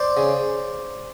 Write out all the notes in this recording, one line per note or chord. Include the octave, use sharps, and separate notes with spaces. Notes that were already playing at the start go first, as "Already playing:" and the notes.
Already playing: C5 D5
C#3